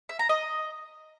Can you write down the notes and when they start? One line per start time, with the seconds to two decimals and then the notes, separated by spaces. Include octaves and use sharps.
0.09 E5
0.19 A#5
0.29 D#5